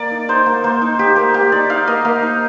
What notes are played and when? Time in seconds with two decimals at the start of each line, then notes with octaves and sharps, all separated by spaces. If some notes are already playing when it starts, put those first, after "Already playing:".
Already playing: A#3 D5
0.11 D#4
0.29 D#4 C5
0.46 A#3
0.64 A#3 C5
0.82 D#4
0.99 D#4 G4
1.16 A#3
1.34 A#3 G4
1.52 D#4 D5
1.70 D#4 F5
1.87 A#3 D#5
2.05 A#3 F5
2.22 D#4